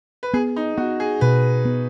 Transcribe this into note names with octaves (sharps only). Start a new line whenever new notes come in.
B4
B3 G#4
D#4
B3 F#4
G#4
B2 B4
B3